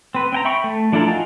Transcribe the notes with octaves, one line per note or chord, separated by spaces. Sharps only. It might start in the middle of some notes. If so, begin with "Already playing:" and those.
C4 B4
C4 G5 A#5
E5 G5 B5 C#6
A3
F3 D4 E4 A4 A#4
D#4 F4 F#4 G#4